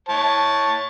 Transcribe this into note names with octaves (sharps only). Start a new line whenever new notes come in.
C#5 A5